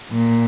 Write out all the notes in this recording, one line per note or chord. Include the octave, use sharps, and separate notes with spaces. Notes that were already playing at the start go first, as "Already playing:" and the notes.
A#2